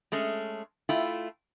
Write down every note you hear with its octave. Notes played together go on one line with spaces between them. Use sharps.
G#3 A3 C#4
A3 E4 F4 G5